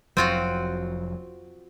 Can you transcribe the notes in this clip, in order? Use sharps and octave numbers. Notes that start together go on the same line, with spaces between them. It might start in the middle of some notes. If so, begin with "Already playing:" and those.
F1 F2 F#3 C4 F4 F#4